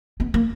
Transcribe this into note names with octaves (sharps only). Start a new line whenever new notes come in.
B3
A#3